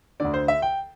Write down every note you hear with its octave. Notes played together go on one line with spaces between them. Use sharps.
D2 D3 D5
C5
E5
G5